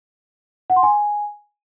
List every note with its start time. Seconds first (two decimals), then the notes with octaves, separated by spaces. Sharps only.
0.70 F#5
0.76 C6
0.83 G#5